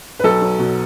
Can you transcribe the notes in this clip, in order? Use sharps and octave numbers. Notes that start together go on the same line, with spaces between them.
B4
B1 A4
F#3
B2